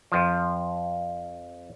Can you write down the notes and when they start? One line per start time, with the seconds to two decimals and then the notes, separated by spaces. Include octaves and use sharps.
0.12 F2 F3